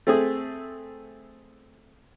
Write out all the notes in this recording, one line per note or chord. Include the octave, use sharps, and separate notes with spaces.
A3 C4 G#4